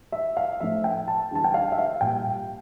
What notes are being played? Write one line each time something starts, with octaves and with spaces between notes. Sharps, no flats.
E5
F5
A2 F3 A3 E5
G5
A5
E2 D3 G3 A5
G5
F5
E5
F5
A#2 G3 G5